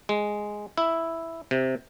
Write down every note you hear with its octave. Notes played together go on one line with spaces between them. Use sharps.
G#3
E4
C3